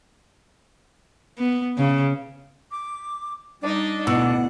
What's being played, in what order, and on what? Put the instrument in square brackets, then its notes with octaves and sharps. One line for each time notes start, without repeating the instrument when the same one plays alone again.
[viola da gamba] B3
C#3
[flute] D6
[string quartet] G3 D#4 D#5 [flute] D4
[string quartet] D2 F#5 [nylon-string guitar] B2 [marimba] E4